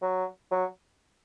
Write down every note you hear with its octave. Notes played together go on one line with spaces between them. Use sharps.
F#3
F#3